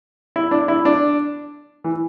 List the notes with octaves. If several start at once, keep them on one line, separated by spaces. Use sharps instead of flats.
E4
D4
E4
D4
E3